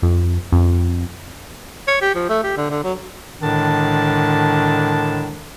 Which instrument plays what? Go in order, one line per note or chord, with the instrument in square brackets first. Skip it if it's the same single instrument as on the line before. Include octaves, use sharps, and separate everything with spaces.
[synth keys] F2
F2
[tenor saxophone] C#5
G4
F3
A3
G4
D3
D3
F#3
[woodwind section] A2 D3 D#3 G#3 D4 A5